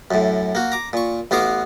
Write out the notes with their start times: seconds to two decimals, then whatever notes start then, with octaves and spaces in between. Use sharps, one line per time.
0.11 F#2 A2
0.55 A#3 F#4
0.72 A#5 D6
0.93 A#2 C#6
1.31 A1 B3 F#4 F5 D6